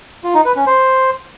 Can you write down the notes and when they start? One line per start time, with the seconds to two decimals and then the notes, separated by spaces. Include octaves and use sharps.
0.24 F4
0.34 D#4
0.45 B4
0.56 C#4
0.67 C5